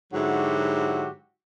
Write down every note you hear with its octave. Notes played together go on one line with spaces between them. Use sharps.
G#2 D3 F#3 E4 F#4 G4